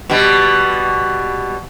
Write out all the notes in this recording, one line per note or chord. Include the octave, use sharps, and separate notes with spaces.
B2 G3